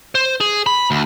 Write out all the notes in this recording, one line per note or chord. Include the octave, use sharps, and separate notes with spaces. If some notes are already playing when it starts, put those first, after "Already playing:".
C5
G#4
B5
D2